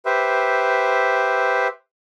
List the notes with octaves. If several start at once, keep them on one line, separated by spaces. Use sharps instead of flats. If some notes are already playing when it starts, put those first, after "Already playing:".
G4 B4 C5 E5